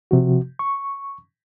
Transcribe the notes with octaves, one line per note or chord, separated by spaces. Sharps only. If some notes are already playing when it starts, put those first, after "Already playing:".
C3 F3 F#4
C#6